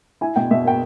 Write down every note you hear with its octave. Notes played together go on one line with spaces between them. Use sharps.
E4 G#5
B2 G5
B2 E5
A#3 G5